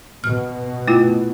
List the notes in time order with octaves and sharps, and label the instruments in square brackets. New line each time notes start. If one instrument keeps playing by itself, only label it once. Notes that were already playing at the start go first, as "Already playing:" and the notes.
[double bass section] B2 [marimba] F6
[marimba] A3 E4 F4